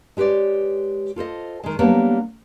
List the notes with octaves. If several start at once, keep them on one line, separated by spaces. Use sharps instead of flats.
G#3 G4 B4 C#5 D5
F4 A4 C5 D#5
D#3 G#3
D3 F#3 G3 A#3 B3